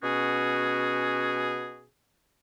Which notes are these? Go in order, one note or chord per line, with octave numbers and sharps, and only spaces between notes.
B2 C#4 F#4 G#4